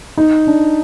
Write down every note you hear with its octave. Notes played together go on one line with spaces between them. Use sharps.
D#4
D4